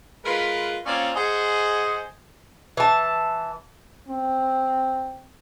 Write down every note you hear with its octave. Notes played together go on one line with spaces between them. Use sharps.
G#3 F4 A#4 B4
A#3 C4 C#4 F4 C#5 D5
G#4 C5 D#5 F#5 G#5
E3 A5
C4